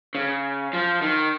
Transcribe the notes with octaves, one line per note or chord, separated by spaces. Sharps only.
C#3
F3
D#3